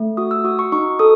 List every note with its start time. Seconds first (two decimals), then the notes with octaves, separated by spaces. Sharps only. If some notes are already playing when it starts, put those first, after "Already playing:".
Already playing: A3
0.17 F#4 D#6
0.31 E6
0.44 F#4 D#6
0.59 C#6
0.72 D#4 C#6
0.99 A4 D#6